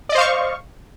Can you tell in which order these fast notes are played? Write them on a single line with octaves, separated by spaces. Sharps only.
D5 D#5 C5 F5 C#6